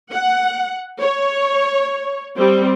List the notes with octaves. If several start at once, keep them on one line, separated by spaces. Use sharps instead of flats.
F#5
C#5
G3 C4